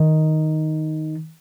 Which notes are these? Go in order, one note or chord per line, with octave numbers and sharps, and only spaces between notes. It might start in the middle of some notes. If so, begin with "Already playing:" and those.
Already playing: D#3